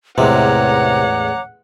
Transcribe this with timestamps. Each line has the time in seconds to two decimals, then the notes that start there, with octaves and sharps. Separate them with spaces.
0.18 A1 E2 C3 G#3 C#5 F#5 A#5 D6